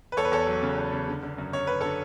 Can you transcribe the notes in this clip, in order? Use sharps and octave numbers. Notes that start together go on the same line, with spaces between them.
B4
E2 A4 C#5
B4
E2 A4 C#5
F#3
C#3
E2
C#3
D3
D3
F#2
F#2 C#5
F#2 B4
D3 A4 C#5